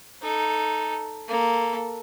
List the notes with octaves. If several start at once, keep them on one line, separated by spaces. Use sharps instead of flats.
D#4 A4
A#3 A4